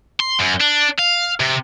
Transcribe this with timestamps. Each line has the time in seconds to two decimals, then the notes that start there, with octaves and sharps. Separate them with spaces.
0.20 C6
0.39 F#2
0.60 D4
0.98 F5
1.40 C3